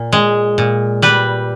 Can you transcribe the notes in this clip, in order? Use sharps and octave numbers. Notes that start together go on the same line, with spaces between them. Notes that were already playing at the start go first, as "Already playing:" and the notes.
Already playing: A#2
G#3
A#2
G3 B4